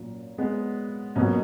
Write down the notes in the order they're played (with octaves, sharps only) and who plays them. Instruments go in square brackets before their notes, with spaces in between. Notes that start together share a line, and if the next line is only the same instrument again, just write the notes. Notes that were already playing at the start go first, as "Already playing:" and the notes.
Already playing: [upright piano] A#2 F#3 A#3 C#4
[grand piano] G#3 B3
[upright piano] B2 F#3 B3 F#4 [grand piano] A#3 C#4